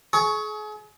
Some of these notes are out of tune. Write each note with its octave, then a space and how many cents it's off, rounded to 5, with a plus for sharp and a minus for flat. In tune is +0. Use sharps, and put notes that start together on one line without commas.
G#4 +35 C#6 +0